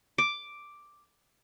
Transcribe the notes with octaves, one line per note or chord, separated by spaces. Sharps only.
D6